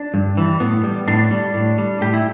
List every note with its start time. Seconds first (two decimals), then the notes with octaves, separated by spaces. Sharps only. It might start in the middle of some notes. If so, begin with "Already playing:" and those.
Already playing: D4
0.14 G2
0.37 E3 G3
0.60 A2 B3
0.84 G3
1.08 A2 D4
1.31 G3
1.54 A2
1.78 G3
2.01 A2 G4
2.14 E4